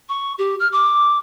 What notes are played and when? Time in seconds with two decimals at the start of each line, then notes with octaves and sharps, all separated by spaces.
0.09 C#6
0.38 G4
0.60 F6
0.72 D6